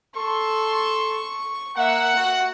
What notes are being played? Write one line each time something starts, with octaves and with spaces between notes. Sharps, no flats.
A4 C6 C#6
A#3 E5 F#5
F#4